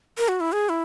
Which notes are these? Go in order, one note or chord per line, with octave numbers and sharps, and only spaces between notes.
A#4
F#4
E4
G#4
E4